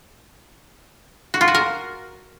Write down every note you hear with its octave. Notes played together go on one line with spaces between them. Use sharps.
F#4
F4
F#4
A#4